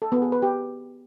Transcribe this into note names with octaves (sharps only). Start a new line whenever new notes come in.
A4
B3
G#4
B4
G4